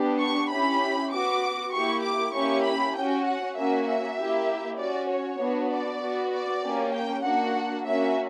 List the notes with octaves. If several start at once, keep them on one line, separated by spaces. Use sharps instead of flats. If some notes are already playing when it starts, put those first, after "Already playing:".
Already playing: B3 D4 G4
C#6
C#4 E4 G4 B5
B3 F#4 D6
A#3 E4 G4 C#6
D6
A#3 C#4 E4 G4 C#6
B5
C#4 F#4 G5
F#5
A#3 C#4 F#4 E5
E5
A#3 E4 G4
C#4 F#4 D5
C#5
B3 D4 F#4
D5
B3 F#4
D5
A#3 C#4 G4
G5
A#3 D4 F#4 F#5
A#3 C#4 F#4 E5